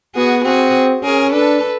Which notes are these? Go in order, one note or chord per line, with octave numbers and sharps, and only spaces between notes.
B3 F#4 G#4
C4 F#4 G#4
C#4 G#4 A#4
D4 A4 B4